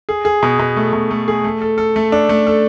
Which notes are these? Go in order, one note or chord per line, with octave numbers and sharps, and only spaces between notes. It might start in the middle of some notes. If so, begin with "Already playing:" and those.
G#4
G#4
B2
B2
A3
B2
A3
G#4
A3
A4
A4
A3
D4
A3
A4